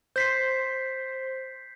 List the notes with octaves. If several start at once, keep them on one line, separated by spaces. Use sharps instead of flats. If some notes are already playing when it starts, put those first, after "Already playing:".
C5 C6 G6 B6 C7